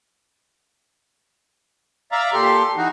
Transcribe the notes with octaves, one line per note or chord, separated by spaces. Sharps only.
D5 E5 F5 A#5
A#2 G4 A4 C6
E3 D#4 F#4